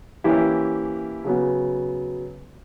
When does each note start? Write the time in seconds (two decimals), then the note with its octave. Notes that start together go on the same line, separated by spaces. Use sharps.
0.24 E3 A#3 C#4 E4 G4
1.24 C#3 F#3 B3